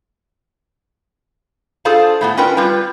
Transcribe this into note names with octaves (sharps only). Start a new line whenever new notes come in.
D4 F4 G#4 A4 C5 F5
A2 A3 B3
C#4 D4 F4 A#4 B4 G5
G3 C4 F4 B4